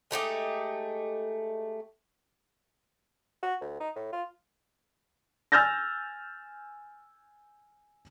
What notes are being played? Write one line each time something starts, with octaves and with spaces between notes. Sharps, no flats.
G#3 A3 D#4 G4
F#4
D2
D#4
A2
F4
G#5 E6 F6 G6 A6 A#6